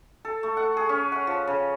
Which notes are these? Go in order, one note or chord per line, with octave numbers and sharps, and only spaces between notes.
A4
A3
F#5
G#4
C#4
F#5
F3
C#3